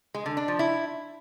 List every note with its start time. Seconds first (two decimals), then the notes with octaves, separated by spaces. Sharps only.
0.15 G#3
0.26 D3
0.37 D4
0.48 F3
0.59 E4